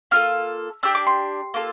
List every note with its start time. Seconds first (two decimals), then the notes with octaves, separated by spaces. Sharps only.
0.11 A#3 F4 A4 F6
0.83 D4 G4 E6
0.95 D6
1.07 C6
1.54 A#3 F4 A4